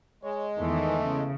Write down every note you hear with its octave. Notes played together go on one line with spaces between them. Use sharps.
G#3 C#5
E2 D#3 E3 A3
C#3